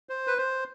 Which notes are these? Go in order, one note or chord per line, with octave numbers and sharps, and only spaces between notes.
C5
B4
C5